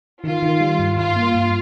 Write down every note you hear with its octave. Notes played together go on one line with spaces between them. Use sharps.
D#3 F4
D#3
G3
G2
G2 F4
A#3
G2